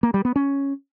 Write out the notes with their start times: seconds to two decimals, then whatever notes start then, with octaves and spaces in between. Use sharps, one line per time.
0.03 A#3
0.14 G3
0.25 B3
0.36 C#4